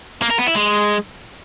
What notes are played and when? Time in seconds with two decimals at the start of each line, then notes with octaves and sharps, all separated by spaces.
0.22 A#3
0.31 A#4
0.39 B3
0.47 E4
0.56 G#3